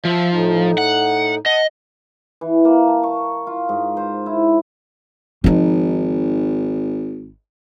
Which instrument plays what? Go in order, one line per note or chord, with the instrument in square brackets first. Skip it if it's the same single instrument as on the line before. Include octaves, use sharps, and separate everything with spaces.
[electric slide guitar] F3 [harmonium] E5
[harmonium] A2 D#4
[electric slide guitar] F#5
[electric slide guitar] D#5 [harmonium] F#5 A5
[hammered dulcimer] E3
A#3
A5
C#6
F4
G#2
C5
E4
[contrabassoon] G#1 [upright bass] F3 D#4